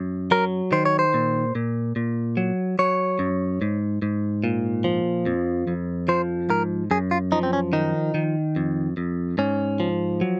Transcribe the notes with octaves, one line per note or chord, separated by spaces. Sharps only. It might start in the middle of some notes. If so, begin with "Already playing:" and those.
Already playing: F#2
F#3 A#4
D#3 C5
C#5
C5
A#2
A#2
A#2
F#3
F#3 C#5
F#2
G#2
G#2
A#2
F3
F2
F2
F3 C5
G#2 A#4
F#2 G#4
F4
F3 D#4
C4
C#4
D#3 D#4
D#3
F2
F2
G#2 C#4
F3
F#3